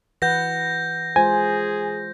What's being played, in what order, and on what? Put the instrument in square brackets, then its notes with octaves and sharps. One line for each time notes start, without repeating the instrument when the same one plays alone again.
[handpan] E3 B4 F#5 [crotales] G6 A#6
[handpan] G#3 F4 C5 [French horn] G#4 [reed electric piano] G#5